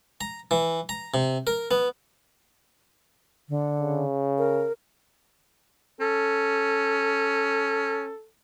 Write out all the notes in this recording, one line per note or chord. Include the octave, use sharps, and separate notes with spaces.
A#5
E3
A#5
C3
A#4
B3
D3
C#3
A#4
C#4 A4